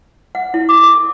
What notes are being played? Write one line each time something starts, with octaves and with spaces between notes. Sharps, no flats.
F#5
E4
D6
A4